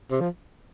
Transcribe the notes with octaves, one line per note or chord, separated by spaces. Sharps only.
C3
F3